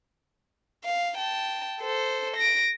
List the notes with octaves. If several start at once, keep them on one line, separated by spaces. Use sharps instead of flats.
F5
G5 A5
A4 C5
A#6 D7